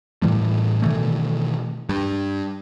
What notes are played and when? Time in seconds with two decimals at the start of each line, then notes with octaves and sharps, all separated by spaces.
0.22 A2 E3 G3 A3
0.82 B2 D#3 E3 A3
1.89 G2